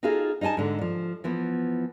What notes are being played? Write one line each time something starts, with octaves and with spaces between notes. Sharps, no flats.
D#4 F4 F#4 G#4 A4 F5
D#4 D#5 E5 G#5 A5
G#2 D3
F3
E3 F3 B3